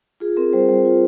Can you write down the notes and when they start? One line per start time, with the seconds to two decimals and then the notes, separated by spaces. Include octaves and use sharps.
0.20 F4 G#4
0.37 C4 A#4
0.53 G3 C5
0.69 G3 C5
0.85 F4